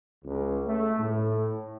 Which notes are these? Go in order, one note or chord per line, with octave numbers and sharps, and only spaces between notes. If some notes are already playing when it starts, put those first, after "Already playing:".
C#2
A3
A2